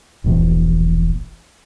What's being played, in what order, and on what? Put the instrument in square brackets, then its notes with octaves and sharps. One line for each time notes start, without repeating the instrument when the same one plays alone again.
[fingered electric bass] E1 A#1 E2